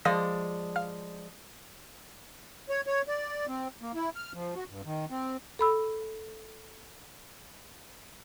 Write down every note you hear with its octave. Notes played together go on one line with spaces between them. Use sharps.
F3 G#3 D5 F5 D#6 A#6
F5 F6
C#5
C#5
D5
C4
A#3
E4
F6
F3
F#4
G2
D#3
C4
A4 B5 E6